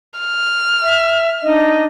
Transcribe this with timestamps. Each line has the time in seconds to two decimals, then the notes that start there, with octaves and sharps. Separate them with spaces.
0.20 F6
0.82 E5
1.43 D4 D#4 D#5